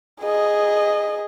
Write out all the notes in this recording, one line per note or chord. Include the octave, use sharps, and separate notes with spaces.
G#4 D#5